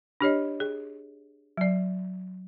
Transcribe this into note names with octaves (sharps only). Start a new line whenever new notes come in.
D4 G4 C#5 D#5
G#4
F#3 D5